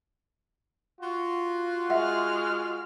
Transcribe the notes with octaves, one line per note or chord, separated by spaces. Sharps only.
F4 F#4
G#3 E5 F#5 F6